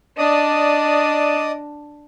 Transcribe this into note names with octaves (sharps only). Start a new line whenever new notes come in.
D4 D5 D#5 D#6